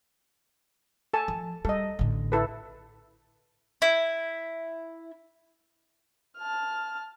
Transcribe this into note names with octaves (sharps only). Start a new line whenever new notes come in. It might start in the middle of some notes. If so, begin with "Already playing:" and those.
A4 G#5 A5
F3
G3 A4 D#5
A1 D3
E4 A4 B4
E4
A5 F6